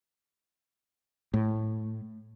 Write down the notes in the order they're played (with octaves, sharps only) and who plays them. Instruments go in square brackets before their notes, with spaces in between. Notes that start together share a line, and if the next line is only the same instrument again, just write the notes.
[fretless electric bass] A2